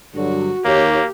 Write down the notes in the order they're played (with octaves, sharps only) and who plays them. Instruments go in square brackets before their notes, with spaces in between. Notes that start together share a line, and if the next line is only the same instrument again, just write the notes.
[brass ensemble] G2 D3 F#3 [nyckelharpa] F#4
[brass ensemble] D#2 C#5 [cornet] A#3 [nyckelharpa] G4